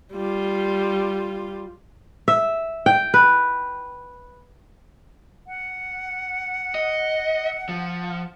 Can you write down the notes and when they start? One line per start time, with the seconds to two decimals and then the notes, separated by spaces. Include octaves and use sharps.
0.12 G3 F4
2.28 E5
2.86 G5
3.14 B4
5.47 F#5
6.75 D#5
7.69 F3